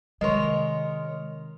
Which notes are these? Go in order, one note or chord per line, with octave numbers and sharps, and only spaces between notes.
C3 D#3 G#3 A#4 C#5 D#5 C6